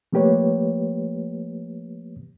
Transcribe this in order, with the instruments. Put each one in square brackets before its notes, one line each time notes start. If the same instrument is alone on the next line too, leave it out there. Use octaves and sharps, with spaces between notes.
[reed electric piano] F3 A3 A#3 G4 B4 C#5